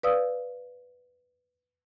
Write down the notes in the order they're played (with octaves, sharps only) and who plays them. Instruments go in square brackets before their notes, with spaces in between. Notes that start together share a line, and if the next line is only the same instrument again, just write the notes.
[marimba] B4 D5 F5 D#6 E6